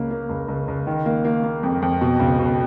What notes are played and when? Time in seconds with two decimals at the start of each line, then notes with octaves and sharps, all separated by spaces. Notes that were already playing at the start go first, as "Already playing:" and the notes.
Already playing: C#2 A#3 C#4
0.11 A#3
0.29 C#2
0.48 C#2
0.68 C#2
0.87 D#3
1.06 A#3
1.25 A#3
1.44 A#3
1.63 F2
1.82 F2
2.01 B2
2.20 C#2
2.39 B2